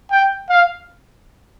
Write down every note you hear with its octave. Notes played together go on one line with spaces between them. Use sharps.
G5
F5